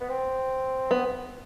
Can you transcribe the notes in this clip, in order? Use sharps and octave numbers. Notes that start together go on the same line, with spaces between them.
B3
C4
B3